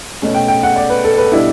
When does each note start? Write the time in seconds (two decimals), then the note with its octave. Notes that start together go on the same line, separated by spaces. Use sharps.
0.22 B2 A3 C#4
0.35 G5
0.48 G5
0.63 F#5
0.76 D5
0.90 B4
1.04 A4
1.18 B4
1.32 B2 G3 D4 E4